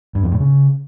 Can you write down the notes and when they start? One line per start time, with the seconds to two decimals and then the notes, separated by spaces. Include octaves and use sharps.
0.15 G2
0.23 F2
0.32 A2
0.40 C#3